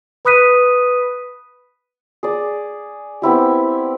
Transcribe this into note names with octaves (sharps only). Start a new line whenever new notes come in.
B4 B5 D#6 F#6 B6 D#7
G#4 D5
B3 C4 E4 G4